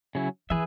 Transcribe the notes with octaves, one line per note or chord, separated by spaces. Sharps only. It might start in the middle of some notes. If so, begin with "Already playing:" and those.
C#3 F#3 C#4 E4
E3 G#4 B4 E5